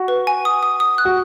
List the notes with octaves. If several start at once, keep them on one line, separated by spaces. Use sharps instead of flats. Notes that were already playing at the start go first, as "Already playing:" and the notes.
Already playing: F#4
B4
G#5
D#6
D#6
D#6
F#6
F#4